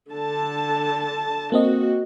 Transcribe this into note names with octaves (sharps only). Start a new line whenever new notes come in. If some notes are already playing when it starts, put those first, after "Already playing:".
D3 A5
A#3 C4 F#4 D#5